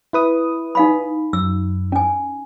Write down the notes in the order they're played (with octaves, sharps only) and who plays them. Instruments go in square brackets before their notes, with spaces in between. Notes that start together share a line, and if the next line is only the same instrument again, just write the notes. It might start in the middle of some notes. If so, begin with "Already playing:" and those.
[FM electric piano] E4 B4 D#6
[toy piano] D#4 F5 B5
[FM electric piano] F#2 [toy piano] E6
[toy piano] C#4 G#5